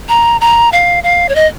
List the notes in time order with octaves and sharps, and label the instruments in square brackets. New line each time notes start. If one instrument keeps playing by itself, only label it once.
[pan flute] A#5
A#5
F5
F5
C#5
D#5